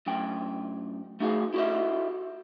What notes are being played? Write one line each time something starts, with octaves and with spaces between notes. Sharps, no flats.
F#2 A2 G5
A3 D#4 F#4 G#4 F5
E4 F#4 G4 A4 D#5 E5